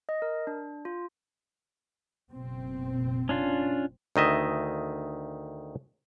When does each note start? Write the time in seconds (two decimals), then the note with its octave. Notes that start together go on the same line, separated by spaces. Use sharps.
0.09 D#5
0.22 A#4
0.47 D4
0.85 F4
2.32 F#1 B2 C4
3.29 C#4 D4 F4
4.16 D2 D#3 D#5 E5